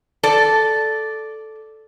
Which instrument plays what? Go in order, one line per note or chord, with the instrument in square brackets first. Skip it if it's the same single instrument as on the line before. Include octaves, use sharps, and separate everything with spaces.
[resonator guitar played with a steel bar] A4 D5